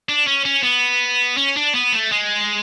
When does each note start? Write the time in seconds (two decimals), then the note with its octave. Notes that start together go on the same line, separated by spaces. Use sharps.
0.09 D4
0.27 C#4
0.45 C#4
0.63 B3
1.37 C#4
1.57 D4
1.75 B3
1.92 A3
2.12 G#3